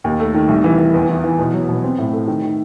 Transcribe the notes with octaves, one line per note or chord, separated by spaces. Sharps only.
D#2
A3
D#3
C2
E3
E3
E2
E3
E3
B2
F#3
B2
C4
A2
A3
D#3
D#3